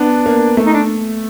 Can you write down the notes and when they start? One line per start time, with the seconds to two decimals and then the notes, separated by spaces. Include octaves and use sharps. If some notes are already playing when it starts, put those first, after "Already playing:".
Already playing: B3 D4
0.26 A#3
0.57 A3
0.66 D#4
0.73 D4